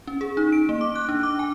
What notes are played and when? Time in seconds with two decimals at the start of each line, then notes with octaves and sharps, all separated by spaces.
0.07 C#4
0.21 G#4
0.37 D#4
0.52 D7
0.69 A#3
0.81 D6
0.96 F#6
1.09 D4
1.23 D6
1.39 G#5